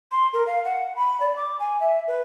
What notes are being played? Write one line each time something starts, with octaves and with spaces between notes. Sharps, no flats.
C6
A#4
F5
F#5
B5
D5
D6
G#5
E5
B4